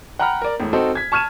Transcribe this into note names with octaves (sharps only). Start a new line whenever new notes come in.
F#5 G5 A#5 B5 F6
A#4 D5
E1 A2
C4 D#4 F#4 A4 C5
G#6 B6
A5 C#6 F6 G#6 D#7 E7